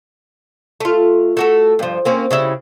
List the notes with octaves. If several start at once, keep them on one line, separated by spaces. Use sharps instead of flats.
A3 F4
A3 F#4 A4
G2 F3
A#3 C4 C#4
C#3 G3 E4